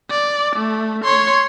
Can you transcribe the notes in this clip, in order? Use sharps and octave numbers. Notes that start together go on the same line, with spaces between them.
D5
A3
C#5 C6